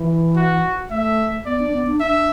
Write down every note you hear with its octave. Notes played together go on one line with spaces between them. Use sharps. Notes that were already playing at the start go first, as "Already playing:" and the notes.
Already playing: E3
F#4
A3 E5
B3 D5
D4
B3
D4
D4 E5